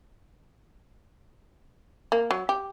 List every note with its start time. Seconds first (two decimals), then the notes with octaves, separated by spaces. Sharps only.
2.12 A#3
2.31 F#3
2.49 G4